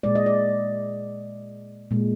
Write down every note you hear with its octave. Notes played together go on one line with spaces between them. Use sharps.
A#2 G#3 D5
D#5
D5
A#2 G#3